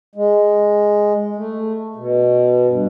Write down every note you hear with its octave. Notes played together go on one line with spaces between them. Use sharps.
G#3
A3
B2
G2